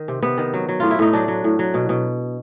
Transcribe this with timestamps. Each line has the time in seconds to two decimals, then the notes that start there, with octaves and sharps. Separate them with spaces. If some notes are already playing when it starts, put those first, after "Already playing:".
Already playing: D#3
0.08 C3
0.23 C3 B3
0.38 D#3
0.54 F#3
0.69 F#3
0.80 A2 F4
0.91 E4
0.99 A2 D#4
1.13 F#3 D4
1.28 F#3
1.44 A2
1.59 F#3
1.74 B2
1.89 B2